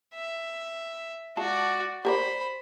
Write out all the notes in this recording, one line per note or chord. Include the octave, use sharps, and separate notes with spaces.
E5
G#3 F4 F#4 D5 A5
G4 A#4 C5 D5 B5